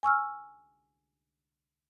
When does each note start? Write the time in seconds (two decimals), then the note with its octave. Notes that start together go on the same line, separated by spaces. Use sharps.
0.03 G#5 C#6 E6 F6